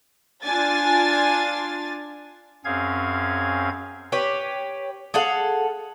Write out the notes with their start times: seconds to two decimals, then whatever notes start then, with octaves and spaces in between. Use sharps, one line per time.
0.44 D4 F4 G#5 A6
2.65 F#2 C4 C#4 G#4 F5 G#6
4.12 G4 B4 C#5
5.14 G#4 A4 F5 F#5